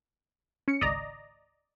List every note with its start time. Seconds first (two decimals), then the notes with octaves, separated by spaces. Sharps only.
0.68 C#4 C#7
0.81 G#1 C#2 D5 D#5 A#5